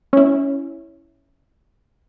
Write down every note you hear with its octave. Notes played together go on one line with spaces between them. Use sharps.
C#4 E4